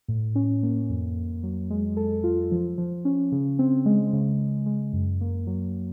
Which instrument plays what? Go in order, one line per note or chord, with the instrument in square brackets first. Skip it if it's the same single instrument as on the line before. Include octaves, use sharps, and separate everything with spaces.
[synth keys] A2
C#4
A#3
F2
F2
F#3
G#3
A4
F4
F3
F3
C#4
C#3
C4
G#3
C#3
C#3
G#3
F#2
A#3
F#3